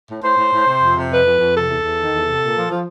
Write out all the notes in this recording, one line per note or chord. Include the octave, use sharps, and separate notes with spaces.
A2
A2 C5
A2
A2
C3
F2
C3
F2 B4
F2
F2
C3 A4
E2
E2
D#3
E2
C3
A#2
F3
F3